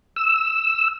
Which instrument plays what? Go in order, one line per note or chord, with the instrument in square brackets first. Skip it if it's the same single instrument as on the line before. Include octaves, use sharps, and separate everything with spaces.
[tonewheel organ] E6